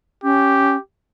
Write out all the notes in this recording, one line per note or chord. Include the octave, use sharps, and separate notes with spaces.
C#4 G4